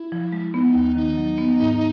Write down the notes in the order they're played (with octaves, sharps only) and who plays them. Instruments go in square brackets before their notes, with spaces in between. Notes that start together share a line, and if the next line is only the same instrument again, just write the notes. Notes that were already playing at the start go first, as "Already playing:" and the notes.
Already playing: [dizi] E4
[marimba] F3
G#3
[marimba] B3 [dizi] D#4
[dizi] E4
D#4
[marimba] D#2
[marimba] D#3 [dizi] D#4
[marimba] F#3
B3
G#2